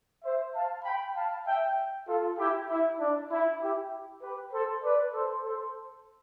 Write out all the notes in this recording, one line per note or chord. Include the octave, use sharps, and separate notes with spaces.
C5 E5
F5 A5
G5 B5
F5 A5
E5 G5
F4 A4
E4 G4
E4
D4
E4
E4 G4
G4 B4
A4 C5
B4 D5
A4 C5
A4 C5